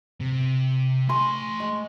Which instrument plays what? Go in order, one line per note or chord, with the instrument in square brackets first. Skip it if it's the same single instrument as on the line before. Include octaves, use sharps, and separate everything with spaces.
[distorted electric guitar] C3
[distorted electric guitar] A3 G#5 [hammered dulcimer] C6 C#6
[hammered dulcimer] G#3